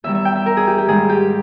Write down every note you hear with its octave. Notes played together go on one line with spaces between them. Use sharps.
E2 D#3 G3 E5
E5
G5
E5
A#4
G#4
G4
G4
G#2 D#3 G3 G#4
G4